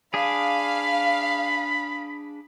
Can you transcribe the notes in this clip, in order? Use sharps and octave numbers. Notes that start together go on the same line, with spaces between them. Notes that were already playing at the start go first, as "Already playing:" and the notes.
D4 G#4 F5 B5